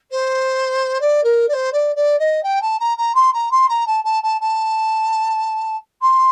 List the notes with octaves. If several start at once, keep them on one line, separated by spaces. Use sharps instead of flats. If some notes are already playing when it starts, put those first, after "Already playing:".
C5
D5
A#4
D5
C5
D5
D5
D#5
G5
A5
A#5
A#5
C6
A#5
C6
A#5
A5
A5
A5
A5
C6